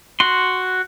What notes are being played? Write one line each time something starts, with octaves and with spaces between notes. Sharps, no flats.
F#4 C6